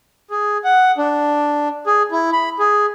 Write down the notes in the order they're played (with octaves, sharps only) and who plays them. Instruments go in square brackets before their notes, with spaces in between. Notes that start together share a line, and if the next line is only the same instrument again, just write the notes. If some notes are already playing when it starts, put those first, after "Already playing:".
[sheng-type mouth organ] G#4
F#5
D4
G#4
E4
B5
G#4